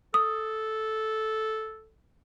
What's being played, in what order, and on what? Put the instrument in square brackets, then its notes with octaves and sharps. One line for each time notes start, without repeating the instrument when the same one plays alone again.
[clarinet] A4 [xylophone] D#6